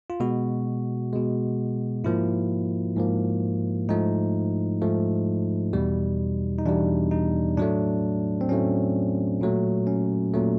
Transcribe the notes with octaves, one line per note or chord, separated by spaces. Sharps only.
F4
B2 G#3 F#4
B2 G#3
G#2 F3 A#3 E4
G#2 F3 A#3
G#2 F3 A3 D#4
G#2 F3 A3
E2 B2 G3
D#4
E2 B2 G3 D4
D#4
A2 F#3 A3 D4
C4
A2 F#3 A3 C#4
A#2 F#3 A3
C#4
A#2 F#3 A3